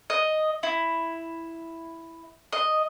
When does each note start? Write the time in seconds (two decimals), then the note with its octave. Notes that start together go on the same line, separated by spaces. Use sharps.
0.10 D#5
0.63 E4
2.53 D#5